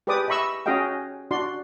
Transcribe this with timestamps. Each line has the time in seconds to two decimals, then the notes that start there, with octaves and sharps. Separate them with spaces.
0.07 G4 G#4 B4 D5 D6 D#6
0.28 D#5 E5 B5 C#6 E6
0.66 C#4 F#4 G#4 D#5 F5 G5
1.31 D4 F#4 D5 C6